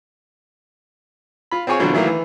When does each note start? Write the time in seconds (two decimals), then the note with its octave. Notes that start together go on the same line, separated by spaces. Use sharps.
1.51 F4 B5
1.67 C4 F4 G#4 C#5 G#5
1.79 B2 D3 E3 F#3 C4 F4
1.93 D#3 E3 F#3 A3 A#3 E4
2.07 E3